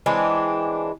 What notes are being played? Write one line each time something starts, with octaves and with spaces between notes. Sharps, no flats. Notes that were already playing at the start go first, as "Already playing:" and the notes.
E3 G#3 C4 D4